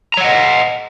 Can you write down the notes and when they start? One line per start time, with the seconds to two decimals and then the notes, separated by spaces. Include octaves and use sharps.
0.14 A#5
0.17 C#5
0.21 F#5
0.24 D#5